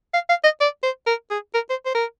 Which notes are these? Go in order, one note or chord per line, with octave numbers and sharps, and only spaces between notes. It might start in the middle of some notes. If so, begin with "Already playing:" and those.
F5
F5
D#5
D5
C5
A#4
G#4
A#4
C5
C5
A#4